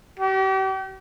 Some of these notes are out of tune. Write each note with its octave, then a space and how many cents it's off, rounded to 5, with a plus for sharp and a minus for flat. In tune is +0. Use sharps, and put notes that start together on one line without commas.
G4 -40